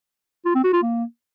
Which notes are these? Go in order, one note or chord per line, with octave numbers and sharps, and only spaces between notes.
F4
C4
F#4
F4
A#3